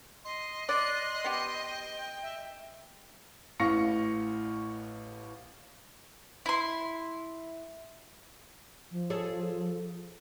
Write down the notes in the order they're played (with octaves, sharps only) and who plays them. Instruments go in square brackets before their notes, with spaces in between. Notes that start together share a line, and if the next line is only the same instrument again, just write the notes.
[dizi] D#5 [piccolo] C6
[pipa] D5 [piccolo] C6 [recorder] F#6
[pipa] B3 G4 [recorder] G5
[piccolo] E5
[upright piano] A1 A2 F5 C#6 A#6 C#7
[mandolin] E4 C6
[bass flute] F3
[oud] G#4 A4 C#5